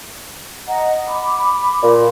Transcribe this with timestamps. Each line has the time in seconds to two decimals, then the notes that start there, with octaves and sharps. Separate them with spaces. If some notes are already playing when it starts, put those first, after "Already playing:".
0.68 D#5 F#5 A#5
1.07 B5 D6
1.83 A#2